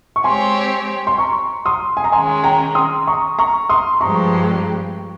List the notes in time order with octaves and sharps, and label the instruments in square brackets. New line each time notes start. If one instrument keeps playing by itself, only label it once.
[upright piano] C#6
[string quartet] G#3 C4 G4 C#5 [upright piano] G#5 C6
[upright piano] C6
A#5 C#6
C6 D#6
G#5
A#5
[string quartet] D#3 G#3 C#4 [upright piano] G#5 C6
[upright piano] G5 A#5
C6 D#6
A#5 C#6
A#5 C#6
C6 D#6
[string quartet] G2 F3 G#3 C4 G4 [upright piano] A#5 C#6